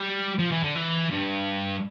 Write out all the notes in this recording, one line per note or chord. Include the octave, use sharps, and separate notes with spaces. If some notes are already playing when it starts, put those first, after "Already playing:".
Already playing: G3
F3
E3
D3
E3
G2